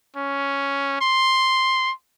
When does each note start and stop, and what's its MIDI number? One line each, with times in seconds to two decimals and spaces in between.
0.16 0.99 61
1.01 1.92 84